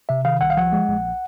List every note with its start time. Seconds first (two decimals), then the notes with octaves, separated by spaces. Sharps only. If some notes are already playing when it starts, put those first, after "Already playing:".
0.09 C3 E5
0.25 D#3 F5
0.41 C2 F#5
0.50 F5
0.57 F3 F#5
0.72 G#3
0.88 A#1